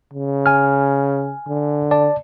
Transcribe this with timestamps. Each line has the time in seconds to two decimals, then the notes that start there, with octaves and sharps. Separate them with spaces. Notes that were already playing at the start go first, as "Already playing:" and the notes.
0.14 C#3
0.46 G#5 F6
1.47 D3
1.91 D5 A5